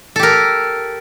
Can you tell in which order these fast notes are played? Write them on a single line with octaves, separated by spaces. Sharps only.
A4 G4 A#4